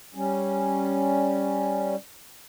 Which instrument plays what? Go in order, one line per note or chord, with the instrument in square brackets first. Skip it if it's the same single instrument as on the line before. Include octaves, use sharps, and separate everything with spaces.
[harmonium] G3 C#4